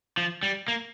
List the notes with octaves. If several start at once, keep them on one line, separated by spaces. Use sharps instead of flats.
F3
G3
A#3